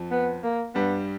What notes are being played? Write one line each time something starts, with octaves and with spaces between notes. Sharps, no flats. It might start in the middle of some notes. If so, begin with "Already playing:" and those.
Already playing: F2 F3
B3
A#3
G2 G3 B3